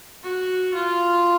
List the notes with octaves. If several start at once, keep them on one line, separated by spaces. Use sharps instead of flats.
F#4
F4